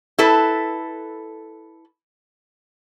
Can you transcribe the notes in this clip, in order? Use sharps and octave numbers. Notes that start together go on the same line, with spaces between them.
E4 A4 B4